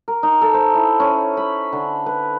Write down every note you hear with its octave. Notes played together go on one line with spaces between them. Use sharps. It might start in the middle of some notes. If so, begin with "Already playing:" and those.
A#4
D#4
A4
C5
E4
C#4
B5
D3
B4